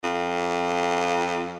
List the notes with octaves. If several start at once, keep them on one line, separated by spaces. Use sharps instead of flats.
F2